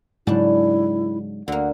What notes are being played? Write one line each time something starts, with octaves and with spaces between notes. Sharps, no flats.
G#2 C#3 F#3 G3 D4 E4
D2 D3 A#3 F#5